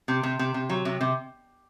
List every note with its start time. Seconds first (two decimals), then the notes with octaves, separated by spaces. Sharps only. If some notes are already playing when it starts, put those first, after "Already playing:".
0.08 C3
0.23 C3
0.39 C3
0.54 C3
0.70 F#3
0.85 C3
1.01 C3